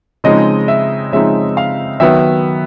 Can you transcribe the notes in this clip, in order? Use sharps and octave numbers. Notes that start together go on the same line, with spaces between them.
C#3 F3 G#3 C4 D#4 D#5
E5
C#3 F3 G#3 C4 D#4 E5
F5
D#3 F#3 B3 E5